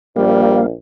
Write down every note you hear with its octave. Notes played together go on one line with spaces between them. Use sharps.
A#1 G3 A#3